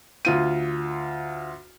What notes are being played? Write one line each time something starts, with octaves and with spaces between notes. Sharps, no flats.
D2 F4 D#7